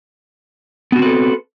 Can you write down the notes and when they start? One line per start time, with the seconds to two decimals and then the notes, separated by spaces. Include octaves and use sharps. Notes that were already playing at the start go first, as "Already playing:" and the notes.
0.92 B3
0.96 F#4
0.99 C4
1.02 B4
1.05 A4